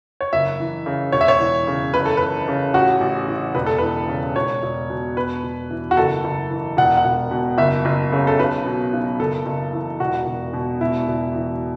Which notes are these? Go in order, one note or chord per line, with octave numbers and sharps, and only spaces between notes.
C#5
F#1 E5
E3
C#3
E1 C#5
E5
C#5
E3
C#3
F#1 B4
A4
E3 B4
C#3
A1 F#4
A1
E3
E1 B4
A4
E3 B4
C#3
E1 C#5
E1
B2
E1 B4
E1
E3
F#4
F#1 A4
F#1
E3
E1 F#5
F#5
E1
B2
F#1 E5
F#1
C#3
A4
B1 B4
B2
B1
F#1 A4
F#1
E3
E1 F#4
E1
B2
E1 E4
E1
E3